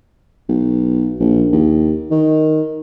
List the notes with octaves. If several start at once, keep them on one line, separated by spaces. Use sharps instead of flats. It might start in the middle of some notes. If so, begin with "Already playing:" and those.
B1
A#1
D#2
D#3